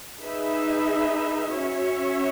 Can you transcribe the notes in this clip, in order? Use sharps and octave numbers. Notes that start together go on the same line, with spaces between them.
D#4 G#4 B4 E5
C#4 F#4 C#5 E5